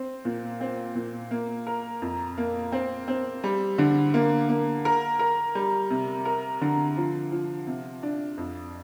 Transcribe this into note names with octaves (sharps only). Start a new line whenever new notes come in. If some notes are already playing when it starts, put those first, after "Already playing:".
Already playing: C4
A#2
C4
A#2
A#3
A#4
F2
A#3
C4
C4
G3
D3
A#3
A#3
A#4
A#4
G3
C3
A#4
D3
F3
F3
C3
D4
F2